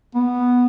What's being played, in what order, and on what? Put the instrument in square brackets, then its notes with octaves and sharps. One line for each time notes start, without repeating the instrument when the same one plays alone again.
[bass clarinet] B3